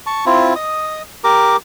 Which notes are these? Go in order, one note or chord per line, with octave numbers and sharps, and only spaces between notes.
A5 C#6
C4 E4 F4
D#5 D#6
G4 A#4 A#5 D6